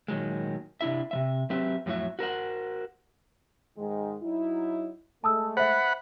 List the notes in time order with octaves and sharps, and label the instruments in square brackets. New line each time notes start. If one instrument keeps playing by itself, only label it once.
[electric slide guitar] A#2 D#3 F#3 G#3
C3 D4 E4 E5
C3 F3 E5
F#3 C4 G4 B4 E5
F2 A2 F#3 A#3 F#4 E5
F#4 A#4 C5 F#5
[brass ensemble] G#2 D#3 G#3
F#3 D#4 E4
[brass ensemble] G#3 A3 [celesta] A5 D#6 E6
[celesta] C5 E5 [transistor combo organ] F#5 B5